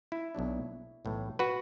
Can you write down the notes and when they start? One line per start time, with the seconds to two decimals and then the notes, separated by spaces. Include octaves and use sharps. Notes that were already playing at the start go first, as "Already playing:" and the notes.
0.12 E4
0.35 B1 B2 F#3 D4
1.05 B1 A2 E3
1.39 F#4 B4